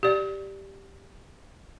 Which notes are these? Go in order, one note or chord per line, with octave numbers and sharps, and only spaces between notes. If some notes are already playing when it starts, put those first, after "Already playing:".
G4 D5